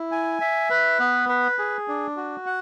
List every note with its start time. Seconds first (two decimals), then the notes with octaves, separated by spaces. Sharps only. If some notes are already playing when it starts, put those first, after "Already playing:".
Already playing: E4
0.12 G#5
0.41 E5
0.70 B4
0.99 B3
1.29 B4
1.59 G#4
1.88 D4
2.17 F#4
2.46 F#5